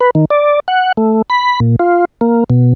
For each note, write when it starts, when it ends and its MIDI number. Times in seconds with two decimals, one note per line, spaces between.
0.01 0.10 71
0.15 0.25 51
0.30 0.60 74
0.68 0.92 78
0.97 1.22 57
1.30 1.60 83
1.60 1.76 46
1.79 2.05 65
2.21 2.44 58
2.50 2.73 47